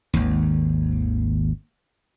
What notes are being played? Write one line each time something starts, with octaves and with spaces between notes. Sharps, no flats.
G#1 D#2